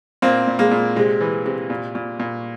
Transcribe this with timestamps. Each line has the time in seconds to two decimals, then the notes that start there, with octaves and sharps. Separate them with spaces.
0.22 A#2 A#3 C4
0.47 A#2
0.59 G#3 A#3
0.71 A#2
0.96 C3 G#3
1.21 E3
1.46 C3
1.70 A#2
1.95 A#2
2.20 A#2